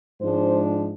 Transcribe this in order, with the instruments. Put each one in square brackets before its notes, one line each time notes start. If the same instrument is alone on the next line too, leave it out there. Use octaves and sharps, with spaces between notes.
[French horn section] G#2 F3 G#3 D4 C5